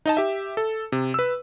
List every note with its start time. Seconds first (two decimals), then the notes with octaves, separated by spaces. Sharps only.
0.06 D#4 D#5 A5
0.17 G4 E5
0.57 A4
0.92 C3
1.14 B4 E6